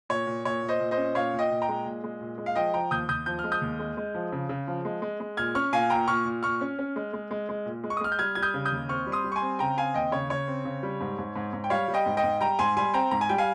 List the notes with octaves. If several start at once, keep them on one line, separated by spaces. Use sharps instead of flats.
A#2 C#5
A#2
A#2 C#5
A#2
C5 D#5
A#2
C5 D#5
C#4
A#2 C#5 F5
A#2
D#5 G5
A#2
G5 A#5
G#3
A#2
G#3
A#2
G#3
F5
F3 D#5 G5
F3 G5 A#5
D#2 D#6 G6
D#2 D#6 G6
F3 G6
F6
G#3
D#6 G6
D#2
G#3
G#3
F3
C#3
C#3
F3
G#3
G#3
G#3
A#2 F6 G#6
C#4 C#6 F6
A#2 F5 G#5
A#2 G5 A#5
A#2 C#6 F6
A#2
A#2 C#6 F6
C#4
C#4
G#3
G#3
G#3
G#3
A#2
G#3
C#6
D#6
G#3 F6
G6
G3 F6 G#6
G3 G#6
D#6 G6
C#3
D#6 G6
D#2
C4 C#6 F6
G3
C6 D#6
G3
C#6
G#5 C6
C4
C#3 G5 A#5
C4 F5 G#5
D#2 D#5 G5
C#3 C#5
C#3 C#5
C4
C#3
G3
G#2
G#2
G#2
G#2
G5
G3 C#5 F5
G3
D#5 G5
G#2
D#5 G5
G#2
G3 G5 A#5
G#2 G#5 C6
G3 G#5 C6
C4 G5 A#5
G#2 A#5
G#5
G3 G5
F5 G#5